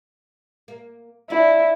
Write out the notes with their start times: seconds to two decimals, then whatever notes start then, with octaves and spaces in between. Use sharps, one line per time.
0.68 A#3
1.30 D4 E4 B4 D5